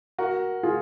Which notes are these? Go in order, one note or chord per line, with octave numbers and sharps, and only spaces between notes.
F#4 A#4
F4 G#4